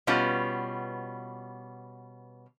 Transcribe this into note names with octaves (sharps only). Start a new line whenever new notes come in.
B2 G3 B3 C#4 F4